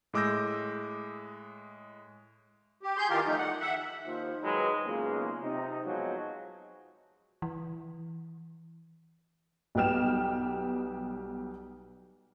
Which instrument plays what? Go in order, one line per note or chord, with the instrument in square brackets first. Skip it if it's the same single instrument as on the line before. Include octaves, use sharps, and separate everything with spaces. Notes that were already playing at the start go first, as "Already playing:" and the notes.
[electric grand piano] A2 G#3 D6 E6 G6 A#6
[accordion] G4
G#4 C6 G6
D#3 E3 F4 G4 A#4
F3 G3 A3 D#4
F#5
E5 F#5
[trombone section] D#2 D#3 F3
D#3 F#3 G#3 B4
B1 E2 C#3 G#3 A#3 F4
C3 D#4
B2 F3 F#3 G#3
[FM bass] E3
[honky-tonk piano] B1 G3 B3 G4 F6 E7